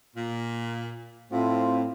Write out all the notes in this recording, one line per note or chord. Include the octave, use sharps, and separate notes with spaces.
A#2
A2 C4 F4